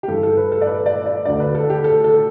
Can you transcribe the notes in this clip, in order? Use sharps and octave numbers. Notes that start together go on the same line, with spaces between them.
G4
G2 E3 A4
A4
B4
A4
D5
B4
D5
D5
D2 D3 D5
B4
A4
G4
A4
A4